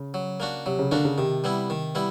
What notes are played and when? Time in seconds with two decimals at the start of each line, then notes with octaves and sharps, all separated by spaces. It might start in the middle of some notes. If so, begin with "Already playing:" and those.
Already playing: C#3
0.14 F#3
0.40 A#3 D4 F#4
0.66 C3 F#3
0.79 C#3
0.91 D3 A#3 D4 F#4
1.05 C#3
1.18 C3 D#3
1.44 G3 B3 E4
1.70 D#3
1.95 G3 B3 E4